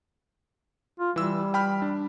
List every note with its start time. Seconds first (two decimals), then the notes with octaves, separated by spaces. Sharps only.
0.99 F4
1.16 E3 G3 E6
1.54 G5 B5 F6
1.82 D4